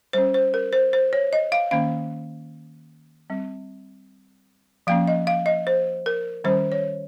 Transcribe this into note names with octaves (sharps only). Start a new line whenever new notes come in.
G3 C#4 C5
C5
A#4
C5
C5
C#5
D#5
F5
D#3 A#3 C#4 F5
G3 C4
F3 A#3 C#4 F5
D#5
F5
D#5
C5
A#4
D#3 G3 C#4 C5
C#5